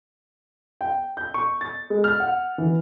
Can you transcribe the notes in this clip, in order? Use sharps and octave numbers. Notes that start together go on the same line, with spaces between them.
G5
G6
C#6
A6
G#3
F6
F#5
E3